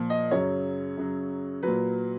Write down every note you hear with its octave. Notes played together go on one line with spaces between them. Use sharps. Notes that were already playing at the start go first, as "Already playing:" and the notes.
Already playing: A#2 F3
D#5
F#2 C#3 F#3 C#5
F#2 C#3 F#3
A#2 F#3 B4